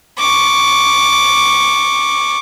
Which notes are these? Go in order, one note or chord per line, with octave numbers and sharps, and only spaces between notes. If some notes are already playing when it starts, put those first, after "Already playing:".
C#6 D6